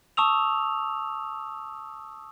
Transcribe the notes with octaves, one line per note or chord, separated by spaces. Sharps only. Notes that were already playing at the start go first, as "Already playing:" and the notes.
A5 C#6 D#6 E6 F7